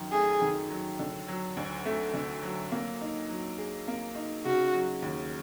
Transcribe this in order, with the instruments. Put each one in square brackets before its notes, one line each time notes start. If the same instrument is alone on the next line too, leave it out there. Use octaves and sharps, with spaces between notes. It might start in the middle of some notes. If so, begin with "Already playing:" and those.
Already playing: [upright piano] F#2 D#3 F#3
[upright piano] A3 [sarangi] G#4
[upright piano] D#3
F#3
D3
F#3
D2
A3
D3
F#3
A#3
D#4
F#3
G#4
A#3
D#4
[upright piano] C#3 [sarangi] F#4
[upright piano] F#3
D#2